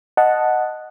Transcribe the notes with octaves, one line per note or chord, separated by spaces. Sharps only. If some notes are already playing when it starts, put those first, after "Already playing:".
D#5 F#5 A5